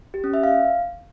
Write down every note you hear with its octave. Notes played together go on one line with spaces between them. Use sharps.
G4
C#4
E5
F5